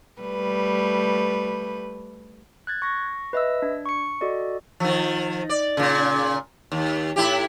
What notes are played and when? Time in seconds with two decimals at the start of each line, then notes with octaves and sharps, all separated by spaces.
0.22 G3 A3 B4
2.67 F#6 G#6 A6
2.82 C#6 A#6
3.33 B4 D#5 E5 E6
3.62 D4
3.86 C#6 C#7
4.21 F#4 A4 D5 D#5
4.80 D#3 F3
5.49 D5
5.77 A#2 C#3
6.72 D#2
7.16 A2 E4 G4